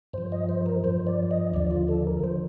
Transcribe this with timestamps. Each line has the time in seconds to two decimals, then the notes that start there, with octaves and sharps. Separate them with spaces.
0.13 G2 F3 C5
0.32 D#5
0.49 C5
0.66 A#4
0.84 G2 F3 C5
1.07 D5
1.31 D#5
1.54 D#2 D3 F3 D5
1.71 F4
1.88 A4
2.07 A#4
2.24 D3 F3 C5